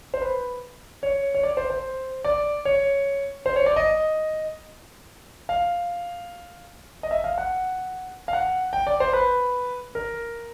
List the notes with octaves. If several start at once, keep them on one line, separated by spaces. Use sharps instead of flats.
C5
B4
C#5
C#5
D5
C5
C5
D5
C#5
C5
C#5
D5
D#5
F5
D#5
E5
F5
F#5
F5
F#5
G5
D5
C5
B4
A#4